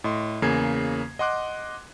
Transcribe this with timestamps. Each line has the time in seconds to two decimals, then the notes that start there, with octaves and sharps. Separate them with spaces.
0.04 A2 D#5 C6
0.42 E2 C#3 A#3 G#5 G#6 C7
1.19 D#5 F#5 C6 D6 F#6